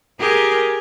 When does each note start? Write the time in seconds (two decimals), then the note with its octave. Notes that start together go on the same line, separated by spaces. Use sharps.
0.20 G4 G#4 A#4